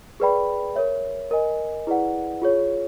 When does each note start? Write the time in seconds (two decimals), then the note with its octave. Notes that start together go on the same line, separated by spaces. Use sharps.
0.20 G#4 B4 D5 G5 B5
0.76 A#4 C#5 E5
1.31 A#4 D#5 G#5
1.87 E4 G#4 B4 D5 F#5
2.42 F4 G#4 C#5